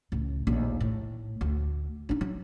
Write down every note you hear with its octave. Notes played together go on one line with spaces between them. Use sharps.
C#2 A2
A#1 D#2
A2
D2
D4 D#4
F#3